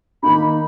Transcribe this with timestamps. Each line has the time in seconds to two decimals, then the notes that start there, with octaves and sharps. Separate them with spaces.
0.23 D#3 A#3 D#4 B5